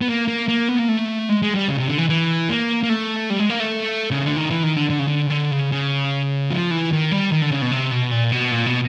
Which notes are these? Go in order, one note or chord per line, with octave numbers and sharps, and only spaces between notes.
B3
A#3
A#3
A#3
B3
A#3
A3
G#3
G#3
G3
C#3
C3
D3
E3
E3
A#3
A#3
A3
G3
G#3
A#3
A3
C#3
D3
D#3
E3
D#3
D3
D3
C#3
D3
C#3
D3
C#3
C#3
F3
E3
D#3
G3
D#3
D3
C#3
B2
C3
B2
A#2
B2
A#2
B2